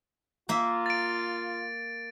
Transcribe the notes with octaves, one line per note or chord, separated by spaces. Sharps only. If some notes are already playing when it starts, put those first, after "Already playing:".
A#3 F4 E5
A6 D7